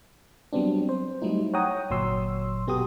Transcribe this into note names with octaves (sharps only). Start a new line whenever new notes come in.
F#3 G3 B3 C4 D4
C5
F#3 G3 A3 D#4 E4
C#5 F#5 G5 A#5 D#6
G1 A#2 F#3 C#5 C6 E6
B2 B3 F#4 G4 A4 D#6